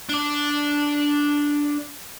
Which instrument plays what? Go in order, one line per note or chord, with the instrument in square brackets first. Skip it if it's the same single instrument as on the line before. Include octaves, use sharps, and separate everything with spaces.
[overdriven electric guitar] D4 D5